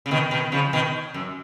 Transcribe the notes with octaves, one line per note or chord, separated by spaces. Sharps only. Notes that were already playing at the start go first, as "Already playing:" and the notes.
C#3
B2 D#3
B2 D#3
C#3 F3
B2 D#3
F#2